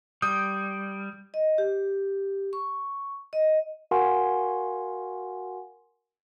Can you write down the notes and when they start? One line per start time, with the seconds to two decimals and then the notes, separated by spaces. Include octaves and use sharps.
0.22 G3 D#6 G6
1.34 D#5
1.58 G4
2.53 C#6
3.33 D#5
3.91 F#4 A#4 F5 F#5 G#5 C6